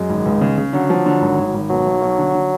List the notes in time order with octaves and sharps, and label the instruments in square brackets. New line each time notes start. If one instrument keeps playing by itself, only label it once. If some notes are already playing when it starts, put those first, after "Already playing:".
Already playing: [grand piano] F#2 [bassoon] G#3
[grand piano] G#1
C#2
C#3
C#3
[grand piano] D3 [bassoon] F#3
[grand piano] F3
D3
G#1
G#1
G#1
[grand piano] B2 [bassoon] F#3
[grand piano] B1
B1
D3
D3